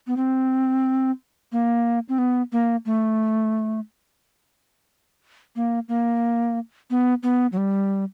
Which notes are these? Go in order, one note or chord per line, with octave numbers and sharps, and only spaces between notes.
B3
C4
A#3
C4
B3
A#3
A3
A#3
A#3
B3
B3
F#3
G3